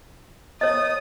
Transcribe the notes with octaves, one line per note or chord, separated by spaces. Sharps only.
C#5 D#5 D#6